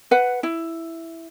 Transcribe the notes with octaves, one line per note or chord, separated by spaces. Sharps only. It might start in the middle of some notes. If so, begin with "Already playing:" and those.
B4 F#5
E4